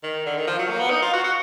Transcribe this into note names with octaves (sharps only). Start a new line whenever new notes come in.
D#3
D3
D#3
F3
F#3
A#3
B3
D#4
F4
F#4
F#4